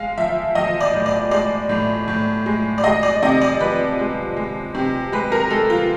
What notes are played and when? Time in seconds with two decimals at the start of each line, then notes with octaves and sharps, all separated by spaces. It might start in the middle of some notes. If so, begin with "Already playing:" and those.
Already playing: G#3 F5
0.18 F3 E5
0.55 F3 D#5
0.80 D5
0.93 A2
1.06 D5
1.31 G#3 D5
1.69 A2
2.08 A2
2.46 G#3
2.78 D5
2.84 G#3 D#5
3.03 D5
3.22 C3 D#5
3.41 D5
3.60 F3 B4
3.99 G#3
4.37 G#3
4.75 C3
5.12 G#3 B4
5.32 A#4
5.50 G#3 A4
5.70 F4